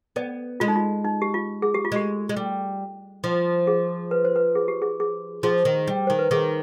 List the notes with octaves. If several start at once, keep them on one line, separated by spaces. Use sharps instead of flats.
B3 D5
G#3 F4
D#4
F4
D#4
G4
F4
G#4
G4
F4
G#3 G4
G#3
G3
F3
G#4
B4
C5
B4
G#4
G4
G#4
G#4
F3 G#4
D#3
G3
D#3 C5
B4
D#3 G#4